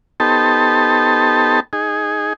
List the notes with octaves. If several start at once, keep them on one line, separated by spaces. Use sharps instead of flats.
B3 D#4 G4 A4 C5 A5
D#4 G#4